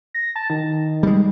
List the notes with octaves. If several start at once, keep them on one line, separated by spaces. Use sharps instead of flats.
A#6
A5
D#3
G3 G#3